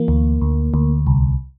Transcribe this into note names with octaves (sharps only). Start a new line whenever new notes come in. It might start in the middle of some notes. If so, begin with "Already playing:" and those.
Already playing: E3 A#3
D2
D2
D2
C2